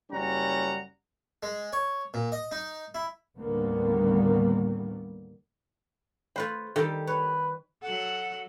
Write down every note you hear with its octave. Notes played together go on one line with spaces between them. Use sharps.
F#1 G3 C#4 F#5 A#5
G#3
C#5
A#2
D#5
D#4
E4
D#2 A2 D3 G3 A#3 B3
A3 F4 B4 C5 B5
D#3 G3 G4 A4
B4 C#5
F#3 F#4 A4 F#5